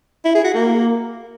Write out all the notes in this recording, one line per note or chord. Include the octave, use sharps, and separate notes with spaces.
E4
G#4
F#4
A#3